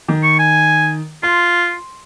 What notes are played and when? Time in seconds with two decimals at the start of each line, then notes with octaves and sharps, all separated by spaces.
0.08 D#3
0.23 C#6
0.39 G#5
1.23 F4 C6